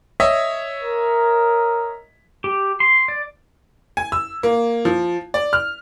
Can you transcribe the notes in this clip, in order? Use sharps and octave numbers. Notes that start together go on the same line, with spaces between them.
C#5 D#5 E5
A#4
G4
C6
D5
G#5
E6
A#3
F3
D5
F6